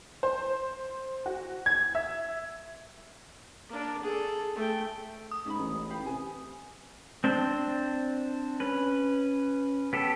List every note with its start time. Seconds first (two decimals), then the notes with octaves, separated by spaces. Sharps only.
0.23 C5
1.26 F#4
1.66 G#6
1.95 E5
3.69 A#3 D4
4.03 G#4 A4
4.56 A3 G5
5.31 D#6
5.46 G#2 C#4 D#4 B5
5.59 A1
5.90 G4 F5 B5
6.06 C3 B4 G#5
7.24 C4 D4 C5
8.60 C#4 B4
9.93 B3 G4 A4